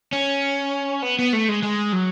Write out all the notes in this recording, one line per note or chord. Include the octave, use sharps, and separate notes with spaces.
C#4
B3
B3
A3
G#3
G#3
F#3